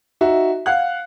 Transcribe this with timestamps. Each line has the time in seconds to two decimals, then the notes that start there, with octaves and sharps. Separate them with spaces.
0.21 D#4 F#4 E5
0.66 F5 F#5 F#6